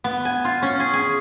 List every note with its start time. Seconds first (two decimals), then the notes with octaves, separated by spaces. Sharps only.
0.04 B3
0.25 G#5
0.45 F4
0.62 C#4
0.80 G#4
0.93 G#4